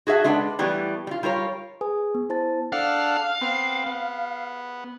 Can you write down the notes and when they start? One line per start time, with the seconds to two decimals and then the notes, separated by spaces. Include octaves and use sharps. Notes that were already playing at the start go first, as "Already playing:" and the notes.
0.07 F#4 G#4 A4 E5 F#5
0.24 G#3 D4 A4 B4 D#5 F#5
0.59 E3 G3 A3 B3
1.07 G3 F4
1.23 G3 F4 A#4 C#5
1.81 G#4 B4 G#5 D#6
2.15 B3
2.29 E4 C5 A5 A6
2.73 D4 A4 F5 F#5
3.41 B3 C4
3.86 B3